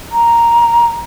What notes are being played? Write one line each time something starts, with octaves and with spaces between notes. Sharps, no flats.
A#5